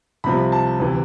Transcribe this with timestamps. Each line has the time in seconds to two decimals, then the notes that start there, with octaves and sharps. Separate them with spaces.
0.24 C2 C3 F3 B5
0.52 A5
0.80 D2 C3 E3